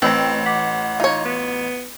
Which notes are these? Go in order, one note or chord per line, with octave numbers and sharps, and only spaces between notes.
A1 C4 B4 G5 A#5 E6
F#5 D6 B6
D#4 F4 C#5
B3